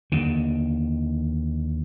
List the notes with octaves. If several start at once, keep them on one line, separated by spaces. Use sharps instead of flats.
D#2 D3